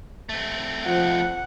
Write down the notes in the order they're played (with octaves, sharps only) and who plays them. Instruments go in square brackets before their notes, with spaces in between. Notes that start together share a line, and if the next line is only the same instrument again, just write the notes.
[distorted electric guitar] A3 C4
[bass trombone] F3 [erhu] F#5